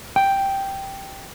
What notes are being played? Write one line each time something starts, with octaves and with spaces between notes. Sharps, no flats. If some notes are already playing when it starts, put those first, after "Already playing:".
G5